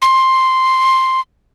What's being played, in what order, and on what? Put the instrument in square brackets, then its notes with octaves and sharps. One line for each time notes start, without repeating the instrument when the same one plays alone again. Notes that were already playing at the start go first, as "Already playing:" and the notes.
[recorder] C6